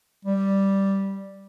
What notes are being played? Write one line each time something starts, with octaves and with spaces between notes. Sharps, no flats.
G3